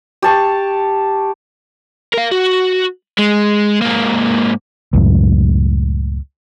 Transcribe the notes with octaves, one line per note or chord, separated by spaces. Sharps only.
G4 A5 C#6
A#4 F5
F#4
G#3
G#2 A#3
C#2 F#2 A2